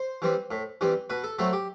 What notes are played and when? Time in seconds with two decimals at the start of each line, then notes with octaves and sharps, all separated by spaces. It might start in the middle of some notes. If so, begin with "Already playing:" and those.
Already playing: C5
0.22 E3 G3 C4
0.51 A2
0.81 E3 G3 C4
1.10 B2 B4
1.24 A4
1.39 F#3 A3 C4 A4
1.53 G4